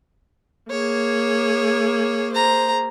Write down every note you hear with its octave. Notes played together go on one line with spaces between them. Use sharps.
A#3 G#4 C#5
C5 A#5